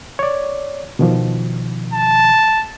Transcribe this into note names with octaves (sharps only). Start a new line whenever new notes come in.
C#5 D5
B2 D#3 F3
A5